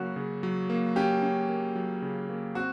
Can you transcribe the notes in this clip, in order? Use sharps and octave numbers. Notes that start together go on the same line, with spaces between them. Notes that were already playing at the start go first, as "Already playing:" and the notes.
Already playing: C#3 F#3 A#3 C#4 F#4
C#3
F#3
A#3
C#4 G4
C#4
A#3
F#3
C#3
A#3
C4 F#4